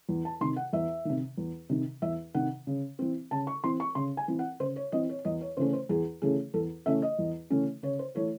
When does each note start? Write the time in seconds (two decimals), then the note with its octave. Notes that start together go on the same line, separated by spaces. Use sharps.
0.09 E2
0.25 A5
0.41 C3 D#3 C6
0.56 F#5
0.73 E2 E5
1.05 C3 D#3
1.37 E2
1.69 C3 D#3
2.02 E2 E5
2.35 C3 D#3 F#5
2.67 C#3
2.99 E3 C4
3.31 C#3 A5
3.47 C#6
3.64 E3 C4 C6
3.80 C#6
3.95 C#3 C6
4.17 G#5
4.28 E3 C4
4.39 F#5
4.60 C#3 C5
4.76 C#5
4.92 E3 C4 D#5
5.09 C#5
5.25 E2 D#5
5.41 C#5
5.57 C#3 E3 A3 C#4 C5
5.73 C5
5.89 E2 G#4
6.22 C#3 E3 A3 C#4 G#4
6.54 E2 A4
6.86 C#3 E3 A3 C#4 E5
7.02 D#5
7.19 E2
7.50 C#3 E3 A3 C#4
7.83 C#3 C#5
7.99 C5
8.15 E3 A3 C#5